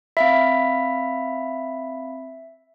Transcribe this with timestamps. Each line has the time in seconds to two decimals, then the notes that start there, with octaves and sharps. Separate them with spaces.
0.17 C4 E5 F5 B5